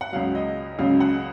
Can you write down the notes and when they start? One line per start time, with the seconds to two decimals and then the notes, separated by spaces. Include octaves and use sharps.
0.01 F#5
0.12 C#2 C#3 F#3 F5
0.35 D#5
0.79 C#2 C#3 F#3 F5
1.00 F#5